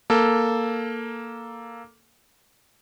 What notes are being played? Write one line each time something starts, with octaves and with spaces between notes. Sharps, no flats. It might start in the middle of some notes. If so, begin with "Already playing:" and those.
A#3 A4